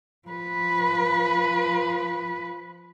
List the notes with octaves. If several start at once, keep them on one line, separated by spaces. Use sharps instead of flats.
F3 B4